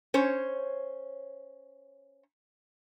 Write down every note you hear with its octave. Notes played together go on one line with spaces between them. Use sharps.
C#4 C5 C#5